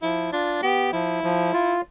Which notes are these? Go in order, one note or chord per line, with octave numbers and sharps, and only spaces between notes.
F3 E4
D4 F4
B3 G4
F3 E4
F3
F4